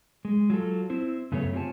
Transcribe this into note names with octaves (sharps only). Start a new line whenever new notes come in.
G#3
F#3 F4 A4
C4 E4 C5
F#2 C#3 A3 B3 G4 C#5
C4 F4 G4 C#5 G#5 A5